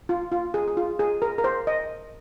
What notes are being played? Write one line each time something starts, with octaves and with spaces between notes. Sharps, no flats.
F4
F4
G#4
G#4
F4
G#4
A#4
A#4
C5
D#5